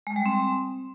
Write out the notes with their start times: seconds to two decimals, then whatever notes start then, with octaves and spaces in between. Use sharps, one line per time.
0.07 G#3
0.16 G3
0.26 C4